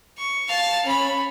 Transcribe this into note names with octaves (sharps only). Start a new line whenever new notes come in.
C#6
F5 A5
C#4 B5